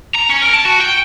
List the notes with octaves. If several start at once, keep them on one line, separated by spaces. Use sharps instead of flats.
A#5
C#4
A#4
A5
F#4
G5